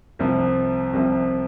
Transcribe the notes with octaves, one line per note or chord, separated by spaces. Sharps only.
C2 C3 F3
C2 C3 F3